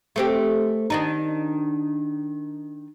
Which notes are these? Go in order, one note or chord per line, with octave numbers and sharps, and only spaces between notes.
A3 C4 G4
D#3 D4 D#4